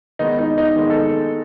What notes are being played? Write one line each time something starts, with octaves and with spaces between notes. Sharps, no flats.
D#3 G#3 B3 D#4
D#4
D#4
D#3 G#3 B3 D#4
A4